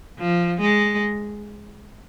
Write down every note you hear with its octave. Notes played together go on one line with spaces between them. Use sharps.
F3
G#3